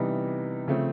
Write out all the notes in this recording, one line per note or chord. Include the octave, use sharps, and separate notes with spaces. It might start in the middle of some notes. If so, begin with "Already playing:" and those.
Already playing: C3 E3 G3 B3 D#4
C#3 F3 A3 C4